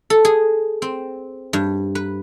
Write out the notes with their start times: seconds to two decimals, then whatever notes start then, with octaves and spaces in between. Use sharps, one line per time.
0.10 A4
0.25 G#4
0.82 C4
1.53 G2
1.95 B4